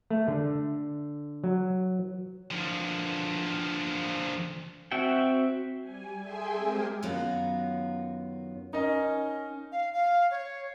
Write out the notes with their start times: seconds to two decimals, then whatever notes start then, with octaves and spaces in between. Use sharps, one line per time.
0.10 A3
0.28 D3
1.44 F#3
2.51 D3 F3
4.92 C4 F#4 E5 F#5 G5
5.81 G3 G#5
6.19 G#4 A4 E5 G5 G#5 C6
6.54 G#3 C4 G4 G#4 A#4
7.03 F#2 D#3 F#3 B3 F4 F#4
8.73 C#4 D#4 A#4 D#5
9.72 F5
9.94 F5
10.31 C#5